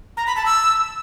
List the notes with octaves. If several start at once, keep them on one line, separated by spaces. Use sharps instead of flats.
A#5
B5
A5
E6